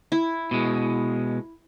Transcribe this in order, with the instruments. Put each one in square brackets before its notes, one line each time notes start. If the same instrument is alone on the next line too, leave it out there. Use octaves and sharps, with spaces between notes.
[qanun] E4
[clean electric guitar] B2 G#3